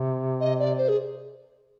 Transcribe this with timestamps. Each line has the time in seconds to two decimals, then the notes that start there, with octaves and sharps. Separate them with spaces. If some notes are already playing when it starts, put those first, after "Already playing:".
Already playing: C3
0.40 D#5
0.59 D5
0.78 C5
0.89 G#4